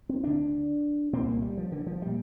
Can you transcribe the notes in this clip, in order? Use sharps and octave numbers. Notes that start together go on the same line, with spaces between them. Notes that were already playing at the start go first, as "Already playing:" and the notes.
C4
D2 D3 D4
C2 A#2 C4
A#3
G3
F3
D3
F3
A#2 G3